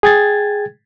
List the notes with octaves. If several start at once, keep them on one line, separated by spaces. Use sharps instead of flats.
G#4 G5 G#6 A6